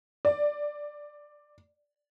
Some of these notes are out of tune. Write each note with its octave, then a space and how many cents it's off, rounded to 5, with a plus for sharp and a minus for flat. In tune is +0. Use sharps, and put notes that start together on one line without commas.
D5 +10